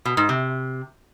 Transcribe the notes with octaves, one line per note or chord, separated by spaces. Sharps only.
B2
G#2
C3